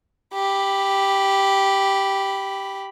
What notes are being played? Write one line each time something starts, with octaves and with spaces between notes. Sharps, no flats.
G4 B5